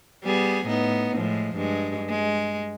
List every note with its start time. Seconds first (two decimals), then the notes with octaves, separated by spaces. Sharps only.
0.24 G3 B3 G#4
0.66 A2 B3 D#4
1.17 A2 F3 G#3
1.56 G2 G#3
2.09 G#3